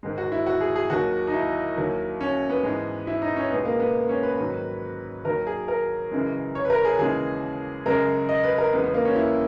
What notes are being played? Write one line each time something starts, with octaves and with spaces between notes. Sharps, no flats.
G#2 D#3 G#3
F#4
E4
F#4
G#4
G#4
D#2 D#3 F#3 F#4
D#4
E4
D#2 D#3 F#3
C#4
B3
G#2 E3 G#3
E4
D#4
C#4
C#2 B2 G#3 B3
A#3
B3
C#4
B4
G#2 D#3 F#3
D#2 D#3 F#3 A#4
G#4
A#4
F#2 C#3 E3 G#3
C#5
B4
A#4
G#4
D#2 C#3 E3 G#3 G#4
F#2 C#3 G#3 A#4
D#5
B4
A#4
E2 C#3 G#3 B3
B3
A#3
C#4
E4